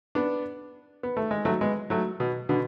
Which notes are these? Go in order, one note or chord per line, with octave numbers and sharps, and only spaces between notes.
B3 D4
B3
A3
G#3
F#3 A3
G#3 B3
F#3 A3
B2
B2 D3